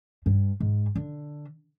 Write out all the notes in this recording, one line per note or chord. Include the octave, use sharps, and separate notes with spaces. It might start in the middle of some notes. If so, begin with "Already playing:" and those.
G2
G#2
D3